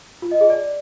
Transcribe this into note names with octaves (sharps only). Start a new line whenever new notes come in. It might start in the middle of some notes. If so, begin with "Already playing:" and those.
F4
D#5
G#4
D5